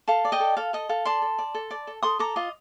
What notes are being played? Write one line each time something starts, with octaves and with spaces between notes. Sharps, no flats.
A4 F5 A5
D5
D#5 G5
A4
A4 F5
A4 D#5
A4 F5
D5 A5 C6
A4
D5
A4
D5
A4
A4 C6 D#6
A4 A#5 D6
F4 D#5